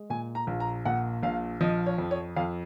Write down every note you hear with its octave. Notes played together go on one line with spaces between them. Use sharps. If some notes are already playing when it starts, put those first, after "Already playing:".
Already playing: G#3
A#2 G#5
A#5
A#1
A#5
A#2 F#5
A#1 F5
F3 D#5
C#5
F2
C#5
F2 F5